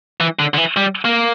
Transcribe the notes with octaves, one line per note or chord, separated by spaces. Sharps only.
E3
D3
D3
E3
G3
A#3